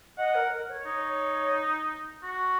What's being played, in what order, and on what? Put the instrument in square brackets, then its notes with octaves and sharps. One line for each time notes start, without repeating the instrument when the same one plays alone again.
[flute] D#5 [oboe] F#5
[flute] A#4
A#4
C#5
[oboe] D#4
F#4